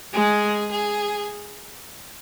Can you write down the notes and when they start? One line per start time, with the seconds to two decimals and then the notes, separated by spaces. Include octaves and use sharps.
0.13 G#3 G#4
0.71 G#4